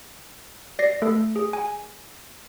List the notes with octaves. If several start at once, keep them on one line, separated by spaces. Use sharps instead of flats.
D5 A#6 C7
A3 A4
G#4
G#5